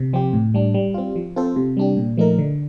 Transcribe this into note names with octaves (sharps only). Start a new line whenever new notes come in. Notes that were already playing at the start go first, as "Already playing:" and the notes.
Already playing: C3
F3 C4 G4
A2
G3 D4
G3
C4 F4
F3
C4 F4 A4 C5
C3
G3 D4 G4
A#2
F3 A3 D#4 A#4
D3